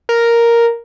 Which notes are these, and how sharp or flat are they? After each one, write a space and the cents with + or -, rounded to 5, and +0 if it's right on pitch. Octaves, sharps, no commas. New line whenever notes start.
A#4 +0